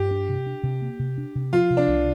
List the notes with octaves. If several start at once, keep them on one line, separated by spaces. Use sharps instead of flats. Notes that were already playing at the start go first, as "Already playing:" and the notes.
Already playing: G2 G4
D4
C3
D4
C3
A#3
C3
D4
C3
F3 F4
C3
D4
C2